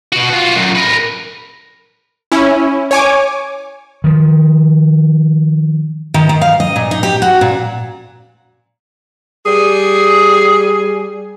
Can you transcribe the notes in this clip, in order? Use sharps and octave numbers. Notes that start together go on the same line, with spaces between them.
B2 F#4
F4 F#4
F#2 A#2
A#4 B4
C#4 E4
C#5 G#5 D6
D#3 F3
D#3
D#3
F5
D#5
A#2
D#4
G4
F#4
A#2
G3 G#4